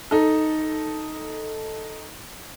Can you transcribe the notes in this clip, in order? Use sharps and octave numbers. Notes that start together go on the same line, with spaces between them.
D#4 A4